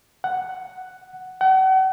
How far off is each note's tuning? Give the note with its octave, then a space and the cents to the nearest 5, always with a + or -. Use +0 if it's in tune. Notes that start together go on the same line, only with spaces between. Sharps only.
F#5 +5
F#5 +40